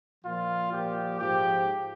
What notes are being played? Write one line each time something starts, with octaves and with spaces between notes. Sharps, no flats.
A#2 F3 F4
A#2 F3 G4
G#2 F3 G4